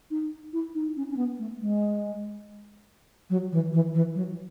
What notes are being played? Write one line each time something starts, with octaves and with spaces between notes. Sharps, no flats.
D#4
E4
D#4
C#4
C#4
B3
A3
G#3
F#3
E3
E3
E3
F#3